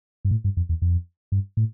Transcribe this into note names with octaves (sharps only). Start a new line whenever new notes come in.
G2
A2
G2
F2
E2
F2
G2
A2